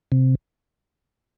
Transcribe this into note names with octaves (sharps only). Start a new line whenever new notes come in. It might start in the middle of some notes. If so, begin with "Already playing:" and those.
C3